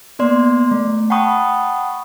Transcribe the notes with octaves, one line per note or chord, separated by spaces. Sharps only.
A#3 B3 D5 C6
A3
F#5 G5 A5 B5 C#6 D#6